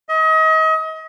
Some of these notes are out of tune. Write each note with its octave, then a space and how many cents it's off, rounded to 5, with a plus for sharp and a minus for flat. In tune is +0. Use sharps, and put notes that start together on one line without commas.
D#5 +35